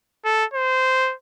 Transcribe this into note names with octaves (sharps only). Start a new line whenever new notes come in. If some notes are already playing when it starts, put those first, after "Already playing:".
A4
C5